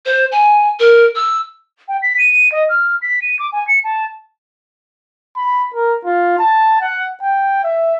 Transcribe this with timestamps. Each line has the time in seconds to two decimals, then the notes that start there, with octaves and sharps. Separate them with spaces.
0.06 C5
0.32 G#5
0.80 A#4
1.15 E6
1.88 G5
2.02 B6
2.18 D#7
2.52 D#5
2.69 F6
3.02 B6
3.22 D#7
3.39 D6
3.53 G#5
3.68 C#7
3.84 A5
5.36 B5
5.74 A#4
6.05 F4
6.39 A5
6.81 F#5
7.22 G5
7.64 E5